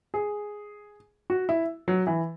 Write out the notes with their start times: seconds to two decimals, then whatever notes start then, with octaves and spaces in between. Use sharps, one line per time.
0.14 G#4
1.30 F#4
1.49 E4
1.88 F#3
2.07 E3